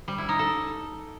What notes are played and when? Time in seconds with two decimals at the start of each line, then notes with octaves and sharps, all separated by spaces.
0.08 G3
0.18 E4
0.29 D#4
0.39 A4